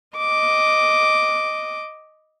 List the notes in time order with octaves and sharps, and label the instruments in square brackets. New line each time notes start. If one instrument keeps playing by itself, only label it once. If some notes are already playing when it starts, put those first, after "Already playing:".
[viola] D#5 D6